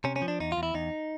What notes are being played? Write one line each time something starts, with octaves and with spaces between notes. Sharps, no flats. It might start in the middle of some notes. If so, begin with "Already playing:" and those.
C3 C#4
C#4
F3
D4
E2 D#4
F4
E2
E4
E2 D#4